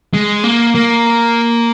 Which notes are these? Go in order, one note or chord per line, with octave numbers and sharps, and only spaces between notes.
G#3
A#3
A#3